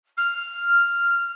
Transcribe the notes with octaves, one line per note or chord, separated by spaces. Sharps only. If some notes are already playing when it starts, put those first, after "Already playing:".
F6